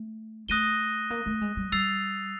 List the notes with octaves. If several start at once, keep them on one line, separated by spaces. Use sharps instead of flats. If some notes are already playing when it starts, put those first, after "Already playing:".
Already playing: A3
A3 D#6 F#6 A#6 D#7 G7
A#3
A3
G#3
G3
G3 E6 A6 C7 F7